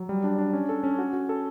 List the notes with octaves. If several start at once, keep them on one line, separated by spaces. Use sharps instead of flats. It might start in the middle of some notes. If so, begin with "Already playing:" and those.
Already playing: F#3
G3
D4
D4
C#4
A4
C#4
F#4
F#4
A4